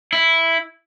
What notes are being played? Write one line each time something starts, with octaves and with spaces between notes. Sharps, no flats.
E4